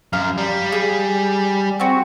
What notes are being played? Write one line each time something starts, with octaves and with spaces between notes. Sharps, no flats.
F#2 F5
G3
G#4
C4 F#4